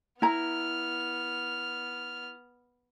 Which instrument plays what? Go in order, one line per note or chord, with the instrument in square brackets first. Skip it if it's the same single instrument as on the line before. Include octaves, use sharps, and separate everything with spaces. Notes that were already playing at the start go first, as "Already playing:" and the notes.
[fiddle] B3 F6 [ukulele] E4 A#5